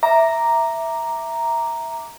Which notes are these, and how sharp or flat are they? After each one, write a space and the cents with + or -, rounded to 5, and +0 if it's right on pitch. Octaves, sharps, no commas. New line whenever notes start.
E5 +0 A#5 +0 D6 +0